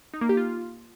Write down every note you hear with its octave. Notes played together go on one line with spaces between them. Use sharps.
D#4
A#3
G4
F4